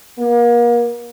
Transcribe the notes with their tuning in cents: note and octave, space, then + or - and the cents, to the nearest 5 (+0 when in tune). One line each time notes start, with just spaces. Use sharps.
A#3 +35